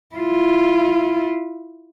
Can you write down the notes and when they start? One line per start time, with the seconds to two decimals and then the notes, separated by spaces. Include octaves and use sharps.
0.15 E4 F4